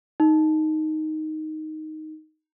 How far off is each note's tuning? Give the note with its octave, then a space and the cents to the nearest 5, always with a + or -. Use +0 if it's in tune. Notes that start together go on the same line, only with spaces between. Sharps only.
D#4 +0